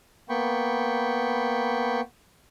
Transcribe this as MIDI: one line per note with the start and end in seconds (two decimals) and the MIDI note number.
0.29 2.01 58
0.29 2.01 59
0.29 2.01 79
0.29 2.01 83
0.29 2.01 85